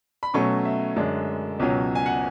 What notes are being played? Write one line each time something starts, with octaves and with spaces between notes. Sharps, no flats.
B5
B2 F#3 A3 C#4 C#6
E5
F#2 D3 G#3 D4
C#2 B2 F#3 C#4
G#5
F#5